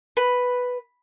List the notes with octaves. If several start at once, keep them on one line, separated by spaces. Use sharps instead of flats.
B4